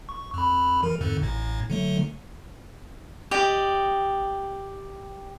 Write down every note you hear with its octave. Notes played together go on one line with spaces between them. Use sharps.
C#6
F2 B5
E3 A#4
F2 G#2 D3
A1 A2
D3 F#3 A3
G4 D5 D#5